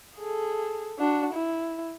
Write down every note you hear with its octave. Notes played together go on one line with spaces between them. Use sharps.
G#4 A4
D4 F#4
E4